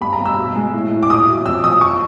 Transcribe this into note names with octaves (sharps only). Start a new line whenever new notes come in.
G2 B5
A#5
G2
E6
B2
G#3
A2
A2
D6
A#2 D#6
F#3
F2 E6
F2 D#6
C#6